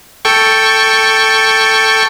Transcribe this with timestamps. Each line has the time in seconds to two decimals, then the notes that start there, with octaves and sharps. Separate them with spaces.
0.25 A4 G5 C#6